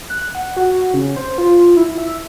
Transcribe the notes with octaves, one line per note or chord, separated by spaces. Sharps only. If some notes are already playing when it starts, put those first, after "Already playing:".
F#6
F#5
F#4
C#3
C5
F4
E4
E5